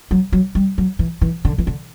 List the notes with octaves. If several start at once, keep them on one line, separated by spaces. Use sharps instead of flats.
F#3
F#3
G3
F#3
E3
E3
D3
E3
D3